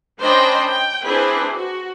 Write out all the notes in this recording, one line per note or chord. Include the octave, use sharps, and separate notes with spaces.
C#4 D4 C5 D#5 G5 B5
G5
C4 D4 E4 G#4 B4 C5
F#4